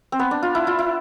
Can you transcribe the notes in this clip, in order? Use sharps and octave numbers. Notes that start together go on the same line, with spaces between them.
C4
B3
D4
F4
E4
F4
E4